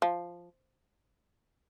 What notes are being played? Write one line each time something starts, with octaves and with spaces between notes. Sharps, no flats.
F3